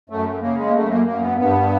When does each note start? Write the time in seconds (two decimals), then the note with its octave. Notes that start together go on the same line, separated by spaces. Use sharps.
0.10 F#2 A3
0.42 C#3 A#3
0.58 G#3
0.66 A#3
0.74 F#2 A3
0.89 A#3
1.06 F#2 A#3
1.22 B3
1.38 G2 B3